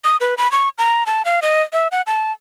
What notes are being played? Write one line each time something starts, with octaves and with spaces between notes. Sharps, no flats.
D#6
B4
B5
C#6
A#5
A5
F5
D#5
E5
F#5
A5